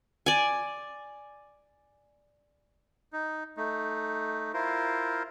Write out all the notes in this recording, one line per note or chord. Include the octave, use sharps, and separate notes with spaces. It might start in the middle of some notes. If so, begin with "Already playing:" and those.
D5 G#5
D#4
A3 D#4
E4 F4 A#4 C5